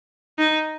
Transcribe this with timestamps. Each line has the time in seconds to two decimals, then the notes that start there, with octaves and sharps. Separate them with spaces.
0.39 D#4